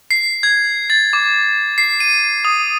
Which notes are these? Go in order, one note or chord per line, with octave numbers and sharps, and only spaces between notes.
C7
G#6
A6
D6
C7
D#7
D#6